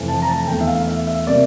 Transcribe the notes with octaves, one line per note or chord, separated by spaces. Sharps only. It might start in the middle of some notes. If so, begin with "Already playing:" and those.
Already playing: F1 F2 E3 A3
A5
A#5
A5
E1 E2 E3 A3 G5
E5
F5
E5
E5
C3 G3 A#3 D5